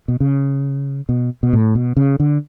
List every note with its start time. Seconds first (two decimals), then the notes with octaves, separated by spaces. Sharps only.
0.08 B2
0.20 C#3
1.09 B2
1.43 B2
1.53 A2
1.75 B2
1.97 C#3
2.20 D3